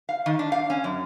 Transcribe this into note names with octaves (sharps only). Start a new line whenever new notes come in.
F5
D#3
D4
F5
C#4
F#2